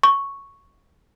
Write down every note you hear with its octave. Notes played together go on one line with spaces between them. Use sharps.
C#6